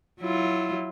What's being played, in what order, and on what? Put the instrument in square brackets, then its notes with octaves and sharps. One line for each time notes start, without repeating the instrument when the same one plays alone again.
[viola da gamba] F#3 E4 F4